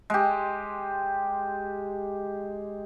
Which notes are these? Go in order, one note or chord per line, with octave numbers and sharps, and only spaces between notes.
G#3 G4